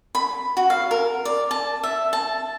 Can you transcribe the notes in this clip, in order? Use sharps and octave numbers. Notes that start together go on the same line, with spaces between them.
B5
F#4
F5
A#4
D5
A5
E5
A5